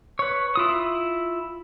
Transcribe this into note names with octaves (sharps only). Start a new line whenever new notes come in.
B4 C#5
E4 F4 D#6